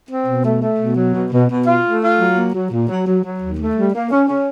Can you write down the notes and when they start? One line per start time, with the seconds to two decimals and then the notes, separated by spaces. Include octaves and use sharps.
0.09 C4
0.27 B2
0.44 A3
0.62 A3
0.79 B2
0.96 F#3
1.14 B2
1.31 B2
1.49 B2
1.66 F4
1.84 A3
2.01 F4
2.19 F#3
2.36 A#3
2.54 F#3
2.71 A#2
2.88 F#3
3.06 F#3
3.23 F#3
3.41 D#2
3.58 A3
3.75 G3
3.93 A#3
4.10 C#4
4.28 C#4